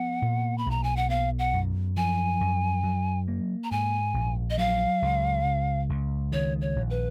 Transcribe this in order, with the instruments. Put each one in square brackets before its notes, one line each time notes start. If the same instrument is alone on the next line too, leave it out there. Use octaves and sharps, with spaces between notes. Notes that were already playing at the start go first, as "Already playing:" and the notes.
Already playing: [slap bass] F3 B3 [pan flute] F#5
[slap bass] A#2
[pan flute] B5
[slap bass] B1 [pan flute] A#5
[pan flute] G#5
F#5
[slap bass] B3 [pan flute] F5
[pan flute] F#5
[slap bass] F#2
[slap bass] F3 [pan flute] G#5
[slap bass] F#2
F#3
A#3
[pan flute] A#5
[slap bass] G#2 [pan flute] G#5
[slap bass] A#1
[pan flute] D#5
[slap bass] F#3 [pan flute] F5
[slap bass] C#2
C#3
C#2
[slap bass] D#3 [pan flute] C#5
[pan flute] C#5
[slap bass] A#1
[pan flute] B4